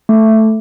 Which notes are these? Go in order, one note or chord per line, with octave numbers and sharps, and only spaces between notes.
A3